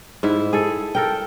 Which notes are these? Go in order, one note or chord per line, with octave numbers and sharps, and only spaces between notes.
G#2 E4 E5
G#4 A4
A4 A#4 G5